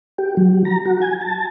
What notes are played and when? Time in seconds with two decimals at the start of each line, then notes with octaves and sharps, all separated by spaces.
0.18 G4
0.37 F#3
0.65 A#5
0.86 F#4
1.02 G#5
1.21 A5